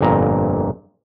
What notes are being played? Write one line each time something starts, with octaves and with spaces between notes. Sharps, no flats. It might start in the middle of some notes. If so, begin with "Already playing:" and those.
G1 F2 A#2 A#5